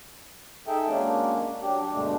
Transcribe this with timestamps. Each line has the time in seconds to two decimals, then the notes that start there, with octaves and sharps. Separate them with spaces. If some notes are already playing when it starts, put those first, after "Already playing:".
0.67 D#4 G#4 A4 E5 G5
0.88 F#3 G#3 A#3 C#4 D4
1.61 F#3 D4 G4
1.92 D2 G2 B2 G#3 A3 D4